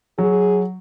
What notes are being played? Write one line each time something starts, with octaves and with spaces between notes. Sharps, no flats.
F#3 G#4